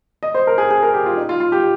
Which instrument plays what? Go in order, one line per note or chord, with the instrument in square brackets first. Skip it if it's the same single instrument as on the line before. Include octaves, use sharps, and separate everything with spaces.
[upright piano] D#5
C5
A#4
G#4
G#4
A#4
G4
F4
D#4
F4
F4
G4